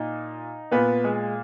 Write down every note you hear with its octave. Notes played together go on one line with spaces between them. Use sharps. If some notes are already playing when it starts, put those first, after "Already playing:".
Already playing: A#2 D#4
A#2 B3 B4
G#3 G#4